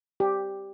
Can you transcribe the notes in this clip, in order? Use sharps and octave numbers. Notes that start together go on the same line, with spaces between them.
G4